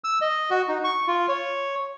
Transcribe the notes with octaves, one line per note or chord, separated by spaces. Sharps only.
E6
D#5
F#4
D#4
C#6
F4
C#5